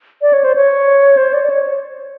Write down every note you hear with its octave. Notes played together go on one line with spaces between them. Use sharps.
D5
C#5
C5
C#5
C5
D5
D5
C#5